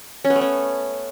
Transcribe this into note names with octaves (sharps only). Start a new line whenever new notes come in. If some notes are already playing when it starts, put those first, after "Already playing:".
C#4
B3
A3
C#4